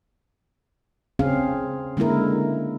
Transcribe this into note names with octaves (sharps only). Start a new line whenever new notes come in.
C#3 C4 C#4 G#4 F5
D3 G#3 A#3 E4 A#4